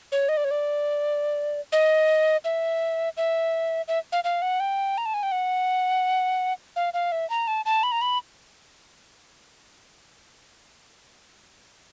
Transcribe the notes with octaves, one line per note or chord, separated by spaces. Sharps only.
C#5
D#5
D5
C#5
D5
D#5
E5
E5
E5
F5
F5
F#5
G5
A#5
A5
G#5
G5
F#5
F5
F5
E5
A#5
A5
A5
B5
A#5
B5